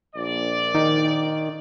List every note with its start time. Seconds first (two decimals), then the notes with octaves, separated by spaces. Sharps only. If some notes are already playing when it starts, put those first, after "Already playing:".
0.16 A#1 D5
0.75 D#3